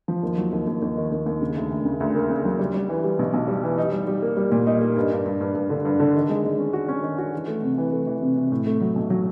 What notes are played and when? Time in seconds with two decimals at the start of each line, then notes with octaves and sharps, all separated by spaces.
0.08 F3
0.23 D#2
0.38 F#3
0.52 D#2
0.67 D#2
0.82 D#2
0.97 D#3
1.12 D#2
1.26 D#2
1.41 C#3
1.56 D2
1.71 D2
1.85 C#3
2.00 D2
2.15 A#3
2.30 C#3
2.45 F#3
2.59 G3
2.74 G3
2.89 E3
3.04 G3
3.19 B1
3.33 B1
3.48 G3
3.63 E3
3.78 D#4
3.92 G3
4.07 G3
4.22 A#3
4.37 G3
4.52 A#2
4.67 D#4
4.81 A#3
4.96 G2
5.11 G2
5.26 G2
5.41 G2
5.55 G2
5.70 D3
5.85 G2
6.00 D3
6.15 D#3
6.30 G#3
6.44 G#3
6.59 C#4
6.73 F#4
6.88 C#4
7.03 D#3
7.18 F#4
7.33 E3
7.48 A3
7.62 C3
7.78 E3
7.92 A3
8.07 E3
8.22 C3
8.36 C3
8.52 A2
8.66 A3
8.81 F#3
8.96 B1
9.10 F#3